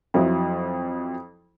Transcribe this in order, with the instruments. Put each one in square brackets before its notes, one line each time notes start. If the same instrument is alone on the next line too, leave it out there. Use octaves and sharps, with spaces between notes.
[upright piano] F2 F3 F#3 E4